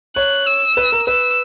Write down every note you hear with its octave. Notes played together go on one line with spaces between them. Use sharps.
C#5 F#6
E6
B4
A#4
B4 E6